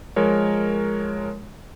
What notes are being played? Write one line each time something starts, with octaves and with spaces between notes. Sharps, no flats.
F3 G#3 A#4 C#5